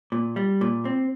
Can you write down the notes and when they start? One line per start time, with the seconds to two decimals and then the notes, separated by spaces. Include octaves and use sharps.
0.12 A#2
0.36 G3
0.61 A#2
0.85 C4